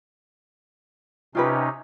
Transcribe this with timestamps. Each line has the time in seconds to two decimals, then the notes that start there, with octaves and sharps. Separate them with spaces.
1.35 C3 C#4 D#4 F4 G4 B4